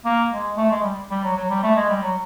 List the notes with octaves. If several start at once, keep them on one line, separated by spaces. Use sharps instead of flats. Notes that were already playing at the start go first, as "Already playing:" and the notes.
A#3
G#3
A3
G#3
G3
G3
F#3
F#3
G3
A3
G#3
G3
F#3